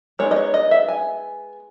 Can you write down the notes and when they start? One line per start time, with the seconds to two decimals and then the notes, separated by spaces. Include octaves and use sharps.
0.19 G#3 B3 D#4 C#5
0.31 D#5
0.36 C#5
0.54 D#5
0.71 E5
0.89 G#5